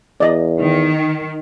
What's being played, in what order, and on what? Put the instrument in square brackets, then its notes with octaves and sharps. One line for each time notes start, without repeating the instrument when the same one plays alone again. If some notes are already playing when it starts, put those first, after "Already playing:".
[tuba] E2 [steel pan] D5 D#5
[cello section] D#3